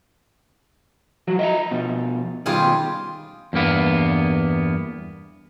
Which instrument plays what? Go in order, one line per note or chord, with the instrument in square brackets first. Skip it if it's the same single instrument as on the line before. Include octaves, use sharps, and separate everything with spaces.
[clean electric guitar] F3 F#3 F#4
D#5 E5 A#5
B2 F3
[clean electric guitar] B2 D#3 [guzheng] G3 F4 G#4
[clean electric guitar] E2 G2 A#3 B3